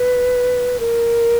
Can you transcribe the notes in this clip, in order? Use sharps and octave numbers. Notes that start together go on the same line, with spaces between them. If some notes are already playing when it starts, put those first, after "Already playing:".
Already playing: B4
A#4